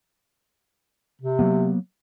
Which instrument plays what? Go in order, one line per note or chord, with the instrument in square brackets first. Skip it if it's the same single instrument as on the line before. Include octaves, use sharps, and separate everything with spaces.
[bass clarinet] C3
[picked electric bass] F#3 A#3 B3